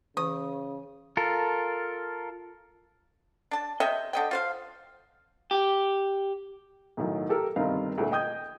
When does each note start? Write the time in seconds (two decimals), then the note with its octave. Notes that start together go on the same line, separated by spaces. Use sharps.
0.17 C#3 E3 D#6
1.17 F4 A4 A#4
3.51 D4 A5
3.80 C3 D#5 E5 G5
4.13 D3 D#5 G5
4.31 F4 C5 F5
5.51 G4
6.97 B1 A2 D#3 F#3
7.29 G4 A4 A#4
7.56 G1 C3 D#3 C4 F5
7.98 D2 A#2 A3
8.11 D#5 G5 D#6 G6 G#6